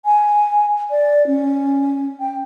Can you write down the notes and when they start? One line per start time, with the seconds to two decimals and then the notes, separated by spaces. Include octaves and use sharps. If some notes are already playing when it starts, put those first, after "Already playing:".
0.05 G#5
0.90 D5
1.27 C#4
2.20 G5